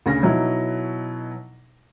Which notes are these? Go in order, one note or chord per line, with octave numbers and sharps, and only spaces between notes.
D2 C#3 A#6
B2 F#3 D#4 E4